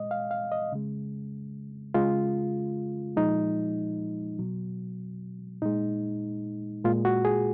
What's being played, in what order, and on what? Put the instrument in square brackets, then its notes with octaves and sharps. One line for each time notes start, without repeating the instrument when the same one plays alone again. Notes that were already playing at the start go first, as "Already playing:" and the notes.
Already playing: [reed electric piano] A#2 G#3 D#5
F5
F5
D#5
C#3 G#3
C#3 G#3 F4
A#2 F3 G#3 D#4
B2 F#3
A#2 G#3 D#4
A#2 G#3 F4
F#4
G#4